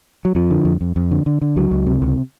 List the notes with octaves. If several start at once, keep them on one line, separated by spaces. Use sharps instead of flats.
F#3
F2 F3
D3
F2
F2
F2
D3
D3
D3
C#2 F#3
C#2
C3
C#2